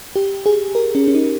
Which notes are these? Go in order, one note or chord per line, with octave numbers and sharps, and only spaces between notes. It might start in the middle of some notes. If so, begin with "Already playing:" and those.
G4
G#4
A#4
C#4
C#4
D#4